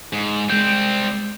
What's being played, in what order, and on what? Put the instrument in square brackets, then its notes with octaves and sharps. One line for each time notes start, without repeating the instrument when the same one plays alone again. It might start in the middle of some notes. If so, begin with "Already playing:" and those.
[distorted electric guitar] G#2
[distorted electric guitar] G3 C4 [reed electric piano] G#3 G6